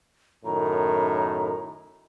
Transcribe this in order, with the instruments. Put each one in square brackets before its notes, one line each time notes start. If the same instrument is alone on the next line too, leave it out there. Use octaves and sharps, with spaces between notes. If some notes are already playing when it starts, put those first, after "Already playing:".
[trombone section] F#2 A2 D#3 [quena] A#5